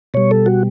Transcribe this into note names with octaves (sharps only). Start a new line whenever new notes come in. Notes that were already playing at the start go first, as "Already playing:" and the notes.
B2 G3 C#5
A4
F#4